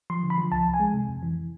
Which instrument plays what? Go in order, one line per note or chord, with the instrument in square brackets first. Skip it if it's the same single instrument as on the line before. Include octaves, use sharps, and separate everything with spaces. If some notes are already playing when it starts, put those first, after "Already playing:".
[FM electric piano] F3 C6
D3
B5
F3
C2 A5
C2
G#5
G#3
C3
F2
E3